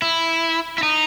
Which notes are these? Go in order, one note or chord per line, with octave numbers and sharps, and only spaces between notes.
E4
E4
D#4